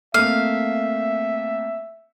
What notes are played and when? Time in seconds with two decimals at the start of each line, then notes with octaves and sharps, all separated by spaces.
0.14 A3 A#3 C4 E5 F5